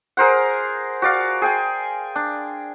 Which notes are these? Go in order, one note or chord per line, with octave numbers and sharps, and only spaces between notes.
G#4 A#4 C5 F#5
F#4 D5 F5
G#4 G5 G#5
D4